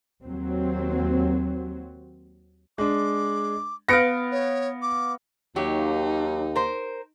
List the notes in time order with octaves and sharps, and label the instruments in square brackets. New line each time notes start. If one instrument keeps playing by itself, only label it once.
[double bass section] D#2 F#3 C4
[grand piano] G#3 D4 [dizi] D6
[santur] B3 F5 [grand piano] A#6 C#7 D7
[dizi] C#5
D6
[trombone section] D#2 [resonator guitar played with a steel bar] F#3 G4 [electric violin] D#4
[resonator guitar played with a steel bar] A#4 C5